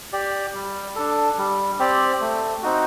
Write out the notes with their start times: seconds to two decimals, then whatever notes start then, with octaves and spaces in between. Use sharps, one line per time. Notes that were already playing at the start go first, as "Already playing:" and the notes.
0.13 G4 D5
0.54 G3
0.95 D4 A4
1.38 G3
1.79 C4 G4 D5
2.21 A3
2.62 C4 D#4 F#4